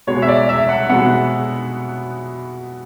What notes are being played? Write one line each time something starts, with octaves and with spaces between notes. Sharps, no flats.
B2 G#3 B3 C#5
E5
D5
E5
F#5
B2 G#3 B3 F#5